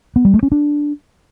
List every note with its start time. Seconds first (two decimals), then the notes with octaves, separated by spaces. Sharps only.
0.16 B3
0.25 G3
0.34 A3
0.43 C#4
0.52 D4